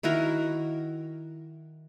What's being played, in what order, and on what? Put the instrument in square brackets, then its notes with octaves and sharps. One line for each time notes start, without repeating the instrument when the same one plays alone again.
[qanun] D#3 E4 F#4 A#4